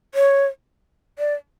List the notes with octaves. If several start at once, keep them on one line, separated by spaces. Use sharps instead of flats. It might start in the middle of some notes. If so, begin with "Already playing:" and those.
C#5
D5